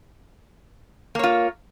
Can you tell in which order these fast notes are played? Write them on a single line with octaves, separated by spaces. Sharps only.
A#3 C#5 F4